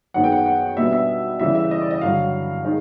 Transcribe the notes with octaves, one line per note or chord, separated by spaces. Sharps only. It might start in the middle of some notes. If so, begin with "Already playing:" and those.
F#2 D#3 G#3 B3 F#5
G5
F#5
F#5
B2 G3 B3 D4 E5
E5
C#3 E3 G3 E5
E5
D#5
D5
D#5
G2 D3 F#3 F5
D#3 G#3